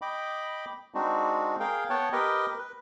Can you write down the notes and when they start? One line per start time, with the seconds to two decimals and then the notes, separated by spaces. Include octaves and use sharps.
0.02 D#5 G5 B5 D6
0.94 G#3 C4 D4 D#4 F#4
1.60 G#4 A#4 F5 G5
1.90 B3 C#5 F#5 G5 A5
2.12 G4 A#4 B4 D#5 G5
2.58 B4